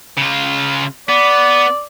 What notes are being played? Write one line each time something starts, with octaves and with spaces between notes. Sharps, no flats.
C#3 F4
B3 D5